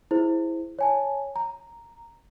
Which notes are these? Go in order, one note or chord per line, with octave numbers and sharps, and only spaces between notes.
E4 G#4 C5
C#5 G#5 A5
A#5